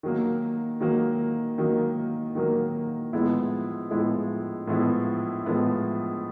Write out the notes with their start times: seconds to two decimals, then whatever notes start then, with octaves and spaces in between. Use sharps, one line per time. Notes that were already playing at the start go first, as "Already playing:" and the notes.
0.03 D#3 F#3 A#3
0.81 D#3 F#3 A#3
1.58 D#3 F#3 A#3
2.35 D#3 F#3 A#3
3.13 A2 F3 G#3 B3 E4
3.90 A2 F3 G#3 B3 E4
4.67 A2 F3 G#3 B3 E4
5.45 A2 F3 G#3 B3 E4